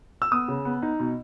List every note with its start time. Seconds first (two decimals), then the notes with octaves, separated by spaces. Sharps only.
0.22 E6
0.31 B3 D#6
0.48 C#3
0.65 B3
0.82 D#4
1.00 B2